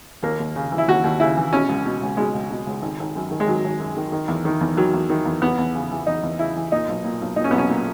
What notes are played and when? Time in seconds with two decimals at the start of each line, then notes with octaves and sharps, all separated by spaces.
0.23 D#2 A#3
0.39 D#2
0.56 C#3
0.72 E3
0.78 E4
0.88 D#2 F#4
1.04 D#2
1.20 C#3 E4
1.37 E3
1.53 B2 C#4
1.69 C#2
1.85 B2
2.01 C#2
2.17 B2 G#3
2.34 C#2
2.51 B2
2.67 C#2
2.82 G#1
2.99 G#1
3.16 F#2
3.31 D#3
3.40 G#3
3.47 G#1 F#3
3.64 G#1
3.80 F#2
3.97 D#3
4.12 D#3
4.28 E2
4.45 D#3
4.61 E2
4.77 D#3 F#3
4.94 E2
5.09 D#3
5.26 E2
5.42 E2 B3
5.58 E2
5.75 C#3
5.91 E3
6.07 E2 D#4
6.23 E2
6.39 C#3 E4
6.56 E3
6.72 A#2 D#4
6.88 B1
7.04 A#2
7.21 B1
7.36 A#2 D#4
7.44 C#4
7.51 B1 B3
7.58 C#4
7.70 A#2